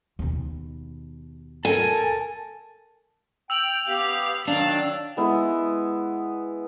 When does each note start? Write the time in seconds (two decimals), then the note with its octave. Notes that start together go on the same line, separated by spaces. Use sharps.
0.19 D#2 B2
1.65 A4 A#4 G#5 A5
3.50 G5 E6 F7 F#7
3.88 B3 G4 F5
4.48 D#3 F#3 D4 F5
5.17 G#3 B3 E4